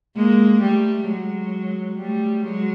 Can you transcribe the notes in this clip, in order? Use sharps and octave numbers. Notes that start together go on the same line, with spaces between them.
G#3 A#3
G3 A3
F#3 G#3
G3 A3
F#3 G#3